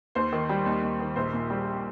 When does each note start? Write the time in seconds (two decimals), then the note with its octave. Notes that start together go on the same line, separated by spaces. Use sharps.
0.15 D#2 C5
0.32 D#3
0.49 G3
0.66 D#2
0.83 D#2
1.00 D#3
1.16 A#1 C5
1.33 A#2
1.50 G3